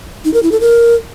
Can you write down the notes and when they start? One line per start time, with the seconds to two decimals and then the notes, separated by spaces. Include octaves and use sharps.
0.25 D#4
0.34 A#4
0.43 E4
0.52 A4
0.61 A#4